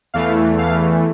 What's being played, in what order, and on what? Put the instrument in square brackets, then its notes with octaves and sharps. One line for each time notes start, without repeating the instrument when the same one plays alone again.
[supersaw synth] E2 E3 A3 F5
F5